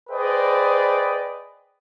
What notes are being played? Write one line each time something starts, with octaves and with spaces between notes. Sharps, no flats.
G#4 B4 C5 D5 D#5 G5